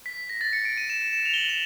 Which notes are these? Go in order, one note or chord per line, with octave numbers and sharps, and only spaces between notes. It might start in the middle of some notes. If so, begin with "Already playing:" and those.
B6
A#6
A6
C#7
D7
D#7
E7
E7
E7
F7
G7
F#7
E7